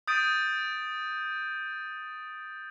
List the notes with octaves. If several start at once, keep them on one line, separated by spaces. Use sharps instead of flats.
D#6 G6 A6 D7 D#7